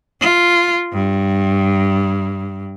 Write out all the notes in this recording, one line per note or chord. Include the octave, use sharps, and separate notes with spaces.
F4
G2